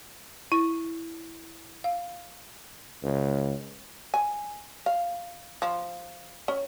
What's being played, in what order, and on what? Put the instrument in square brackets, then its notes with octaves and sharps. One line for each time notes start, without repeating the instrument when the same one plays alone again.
[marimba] E4
F5
[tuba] C#2
[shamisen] G#5
F5
F3
C#4